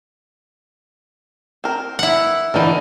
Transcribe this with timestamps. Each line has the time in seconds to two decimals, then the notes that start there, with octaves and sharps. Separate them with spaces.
1.64 C4 A#4
1.99 E4 F#5
2.54 D3 E3 D#4 A#4